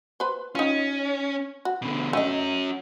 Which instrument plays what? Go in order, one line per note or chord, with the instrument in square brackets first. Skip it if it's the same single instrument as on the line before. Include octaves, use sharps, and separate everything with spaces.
[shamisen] B4 C5
[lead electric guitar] C#4 [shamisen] D#4 F4
[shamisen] F#4
[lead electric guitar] B2 D3
[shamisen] A3 D#5 [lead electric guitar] C#4 F#4